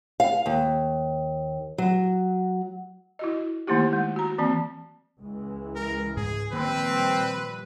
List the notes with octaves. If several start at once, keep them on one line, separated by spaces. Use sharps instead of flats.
F5
D#2
F#3
E4 F#4 D#5
D#3 A3 A#3 D#4 E4 G4
G#3
F#4 A#5
E3 A#3 C4 A5
C#2 E3 G#3
A#4
G#2 G#4
A#2 D#3 F3 G3 A#3 C4 B4